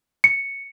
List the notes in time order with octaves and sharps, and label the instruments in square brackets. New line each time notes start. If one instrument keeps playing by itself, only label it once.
[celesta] C#7